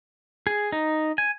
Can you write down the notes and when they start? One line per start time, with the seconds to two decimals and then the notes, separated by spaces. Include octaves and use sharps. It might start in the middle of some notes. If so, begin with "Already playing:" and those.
0.47 G#4
0.72 D#4
1.18 G#5